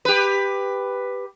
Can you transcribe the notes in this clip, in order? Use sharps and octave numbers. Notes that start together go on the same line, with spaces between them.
G4 B4